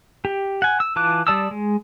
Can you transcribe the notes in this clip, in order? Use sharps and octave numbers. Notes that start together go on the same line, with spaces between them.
G4
F#5 G#5
E6
E3 F4 A5 D6 F#6
G3 D5 A5 D#6 E6
G#3